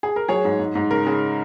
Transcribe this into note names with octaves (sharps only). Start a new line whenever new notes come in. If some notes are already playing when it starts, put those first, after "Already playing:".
G#4
A#4
F#3 G#4 C#5
G#2
G#2
G#2
C#3 A#4
C#3